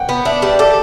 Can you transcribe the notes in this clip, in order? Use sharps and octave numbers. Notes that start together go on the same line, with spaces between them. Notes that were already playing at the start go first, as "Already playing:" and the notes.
Already playing: F#5 G5
B3
D4 E5
G3
A4 D5